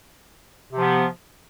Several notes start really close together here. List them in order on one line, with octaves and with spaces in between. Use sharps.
C3 F3 B3